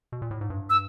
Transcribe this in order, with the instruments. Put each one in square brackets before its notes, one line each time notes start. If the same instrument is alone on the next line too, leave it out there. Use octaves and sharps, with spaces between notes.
[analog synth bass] B2
A#2
A2
G#2
G2
[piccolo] E6